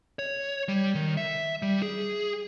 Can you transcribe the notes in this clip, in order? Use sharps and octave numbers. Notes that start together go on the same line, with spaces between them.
C#5
G3
D#3
E5
G3
G#4